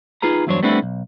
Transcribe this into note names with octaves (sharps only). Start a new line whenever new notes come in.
D#4 F4 G#4 B4 A#5
E2 G2 F#3 D4 C5 C#5
G3 A3 B3 C4 D4 E4
B1